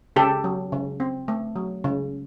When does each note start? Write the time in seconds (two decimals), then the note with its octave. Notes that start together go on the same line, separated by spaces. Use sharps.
0.16 C#3 G4 A4
0.44 F#3
0.72 C#3
1.00 C4
1.28 A3
1.56 F#3
1.84 C#3